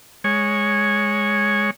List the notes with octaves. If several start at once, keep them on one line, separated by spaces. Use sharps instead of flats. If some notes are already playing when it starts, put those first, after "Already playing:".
G#3 C#5